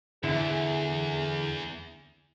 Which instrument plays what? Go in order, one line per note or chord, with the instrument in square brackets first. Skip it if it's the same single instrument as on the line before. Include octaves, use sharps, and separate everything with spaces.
[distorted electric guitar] E2 G#2 [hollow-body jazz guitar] D3 E4 [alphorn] G#4